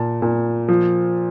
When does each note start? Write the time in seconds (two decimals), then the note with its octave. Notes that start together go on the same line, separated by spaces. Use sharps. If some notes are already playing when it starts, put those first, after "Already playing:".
Already playing: A#2 A5
0.22 A#2
0.68 F3